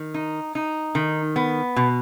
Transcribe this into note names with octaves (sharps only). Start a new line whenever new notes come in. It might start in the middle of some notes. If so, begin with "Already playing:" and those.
Already playing: D#3
D#4
D#4
D#3
B3
B2